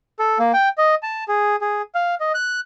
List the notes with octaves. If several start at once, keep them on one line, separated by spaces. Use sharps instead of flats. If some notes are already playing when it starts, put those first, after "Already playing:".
A4
A#3
G5
D#5
A5
G#4
G#4
F5
D#5
F#6